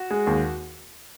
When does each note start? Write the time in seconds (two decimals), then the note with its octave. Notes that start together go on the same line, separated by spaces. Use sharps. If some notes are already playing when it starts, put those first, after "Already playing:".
Already playing: F#4
0.11 G#3
0.27 D#2